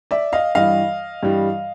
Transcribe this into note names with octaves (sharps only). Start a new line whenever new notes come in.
D5 E5
D#5 F5
G2 E3 G3 D#5 F5
G2 E3 G3